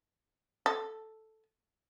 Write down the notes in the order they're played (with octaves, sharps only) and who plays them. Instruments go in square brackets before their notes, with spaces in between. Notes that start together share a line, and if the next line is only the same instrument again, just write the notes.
[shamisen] A4